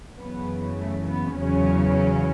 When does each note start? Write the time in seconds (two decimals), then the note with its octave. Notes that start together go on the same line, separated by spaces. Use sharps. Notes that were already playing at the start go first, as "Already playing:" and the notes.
0.18 F#2 C#3 E3 B3
0.78 A3
1.07 B3
1.36 E2 C#3 F#3 C#4